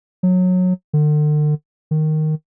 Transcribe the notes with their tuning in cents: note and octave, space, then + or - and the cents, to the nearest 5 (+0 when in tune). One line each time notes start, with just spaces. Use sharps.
F#3 -20
D3 +40
D#3 -5